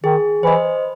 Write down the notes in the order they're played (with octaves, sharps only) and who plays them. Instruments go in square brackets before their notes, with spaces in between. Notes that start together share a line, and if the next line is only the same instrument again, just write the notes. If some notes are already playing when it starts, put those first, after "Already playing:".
[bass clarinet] D#3 [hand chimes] G#4
[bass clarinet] E3 [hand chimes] C5 D#5